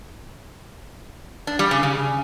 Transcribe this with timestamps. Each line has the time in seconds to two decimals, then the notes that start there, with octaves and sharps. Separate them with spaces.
1.47 D4
1.59 G3
1.71 C#3
1.83 C#3